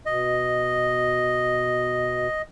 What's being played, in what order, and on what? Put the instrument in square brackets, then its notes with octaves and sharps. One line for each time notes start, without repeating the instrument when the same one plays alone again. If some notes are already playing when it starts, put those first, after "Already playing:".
[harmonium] B2 [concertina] D#5